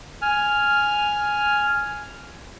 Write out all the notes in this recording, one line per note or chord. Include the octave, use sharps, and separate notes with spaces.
G#5 F6